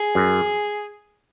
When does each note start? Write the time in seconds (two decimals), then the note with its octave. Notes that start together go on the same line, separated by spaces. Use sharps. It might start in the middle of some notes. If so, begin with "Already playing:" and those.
Already playing: G#4
0.15 F#2